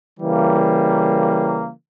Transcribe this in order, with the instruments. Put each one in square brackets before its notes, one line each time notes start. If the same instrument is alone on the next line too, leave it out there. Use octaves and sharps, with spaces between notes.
[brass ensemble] C#3 E3 G3 A#3